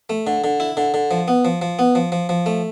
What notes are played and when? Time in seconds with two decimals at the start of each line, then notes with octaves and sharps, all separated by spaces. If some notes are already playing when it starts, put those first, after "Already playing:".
0.10 A3
0.27 D3
0.44 D3
0.60 E4
0.77 D3
0.94 D3
1.11 F3
1.28 B3
1.45 F3
1.62 F3
1.79 B3
1.95 F3
2.12 F3
2.29 F3
2.46 A3